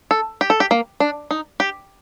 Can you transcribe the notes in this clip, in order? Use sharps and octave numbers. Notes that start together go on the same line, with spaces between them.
A4
G4
A4
G4
A#3
D4
D#4
G4